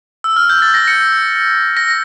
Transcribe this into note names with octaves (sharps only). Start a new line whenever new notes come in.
E6
F6
G6
A6
A#6
C#7
A#6